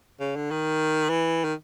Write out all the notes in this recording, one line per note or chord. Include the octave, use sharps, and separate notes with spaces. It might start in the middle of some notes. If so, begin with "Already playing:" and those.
C#3
D3
D#3
E3
D#3